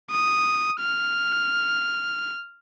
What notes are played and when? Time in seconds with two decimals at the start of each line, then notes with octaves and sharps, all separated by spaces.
0.11 D#6
0.80 F6